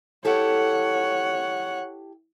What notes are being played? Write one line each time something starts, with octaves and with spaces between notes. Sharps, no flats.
E4 G4 A4 C#5 F#5